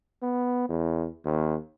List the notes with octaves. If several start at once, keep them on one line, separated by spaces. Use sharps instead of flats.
B3
E2
D#2